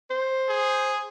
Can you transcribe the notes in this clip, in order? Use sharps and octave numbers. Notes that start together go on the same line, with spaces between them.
C5
G#4